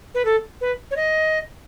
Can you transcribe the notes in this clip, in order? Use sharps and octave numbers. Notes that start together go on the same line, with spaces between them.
B4
A4
B4
C#5
D#5